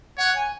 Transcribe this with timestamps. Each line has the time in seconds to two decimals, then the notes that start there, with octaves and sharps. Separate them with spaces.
0.18 C#5 F#5
0.36 G#5